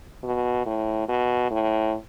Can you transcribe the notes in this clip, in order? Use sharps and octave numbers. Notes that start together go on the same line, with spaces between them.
B2
A2
B2
A2